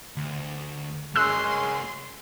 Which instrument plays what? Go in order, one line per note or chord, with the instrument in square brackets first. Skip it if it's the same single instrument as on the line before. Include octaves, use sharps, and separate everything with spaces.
[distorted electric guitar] D2
[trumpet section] G#3 C#4 [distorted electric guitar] A#3 F#4 [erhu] C6 [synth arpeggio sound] E6 F#6